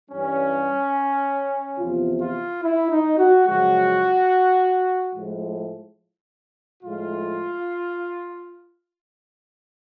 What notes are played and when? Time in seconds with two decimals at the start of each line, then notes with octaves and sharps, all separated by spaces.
0.10 G2 E3 G3 C#4
1.79 E2 C3 F3 F4
2.21 F4
2.63 E4
2.91 D#4
3.19 F#4
3.47 F#2 C#3 F3 G#3 F#4
5.15 A2 F3 G#3
6.83 A2 F3 G#3 F4